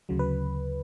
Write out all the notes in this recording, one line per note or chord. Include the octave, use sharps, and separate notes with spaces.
D2 C#3 F#3
B4